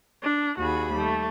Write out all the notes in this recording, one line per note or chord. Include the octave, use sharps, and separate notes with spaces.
D4
D#2 F#4 G#4 B5
G3 A3